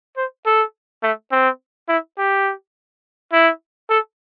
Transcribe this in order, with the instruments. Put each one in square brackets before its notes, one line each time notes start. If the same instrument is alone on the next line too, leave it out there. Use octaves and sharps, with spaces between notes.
[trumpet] C5
A4
A3
C4
E4
G4
E4
A4